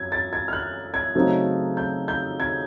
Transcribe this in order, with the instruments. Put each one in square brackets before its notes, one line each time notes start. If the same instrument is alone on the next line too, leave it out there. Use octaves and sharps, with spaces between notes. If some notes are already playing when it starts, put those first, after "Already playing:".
Already playing: [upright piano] F#2 G#6
A6
G#6
F6
F#6
G#6
C#3 F#3 A3 C4 D#4
G6
G6
G#6